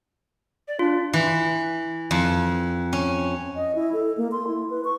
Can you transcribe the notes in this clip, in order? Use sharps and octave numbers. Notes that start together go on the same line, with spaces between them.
D5
D4 F4
E3
F2
C#4
D#5
E4
A4
A#3
C6
E4
B4
C#6